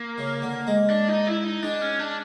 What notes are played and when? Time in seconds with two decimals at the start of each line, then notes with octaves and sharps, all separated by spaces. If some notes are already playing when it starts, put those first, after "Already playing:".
Already playing: A#3
0.18 C#3
0.42 D3
0.67 G#3
0.90 D4
1.08 D#4
1.27 E4
1.44 D#4
1.63 G#3 D4
1.81 C#4
1.99 D4